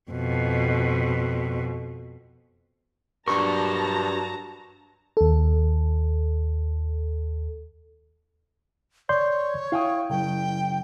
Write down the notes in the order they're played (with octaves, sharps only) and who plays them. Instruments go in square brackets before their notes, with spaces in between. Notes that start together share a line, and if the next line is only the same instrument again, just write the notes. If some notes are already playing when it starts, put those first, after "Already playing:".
[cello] F2 B2
[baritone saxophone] G2 [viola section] F#3 A5 A#5 [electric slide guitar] D4 A#4 [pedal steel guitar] C#6
[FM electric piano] D#2 A4
[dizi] C#5 [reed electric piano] D5 C6 G6
[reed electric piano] E4 [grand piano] F5 G5 D#6
[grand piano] F#1 [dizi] G5